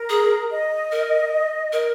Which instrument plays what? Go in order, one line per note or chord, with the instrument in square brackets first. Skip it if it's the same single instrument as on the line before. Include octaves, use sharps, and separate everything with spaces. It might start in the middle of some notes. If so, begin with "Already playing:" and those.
Already playing: [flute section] A#4
[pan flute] G#4
[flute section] D#5
[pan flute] A#4
A#4